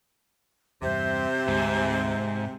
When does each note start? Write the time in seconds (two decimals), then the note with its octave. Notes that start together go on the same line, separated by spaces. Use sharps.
0.82 E2 G2 C3 C5 E5
1.47 D2 G#2